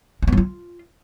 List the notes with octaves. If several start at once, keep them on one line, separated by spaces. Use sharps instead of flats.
C4
B3
F#3
F4